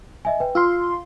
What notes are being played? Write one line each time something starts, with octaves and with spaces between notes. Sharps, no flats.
D#5 E5 G#5
B4 G5
F4 C6 E6 F6